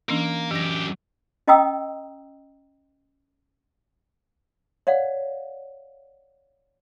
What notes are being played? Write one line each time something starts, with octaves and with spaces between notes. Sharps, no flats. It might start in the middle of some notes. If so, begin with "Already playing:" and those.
E3 A#3 C#4 D4
F#2 E3 G4 A#6
C#4 D#5 G5 A#5 D#6 E6
C#5 D5 F5 F#5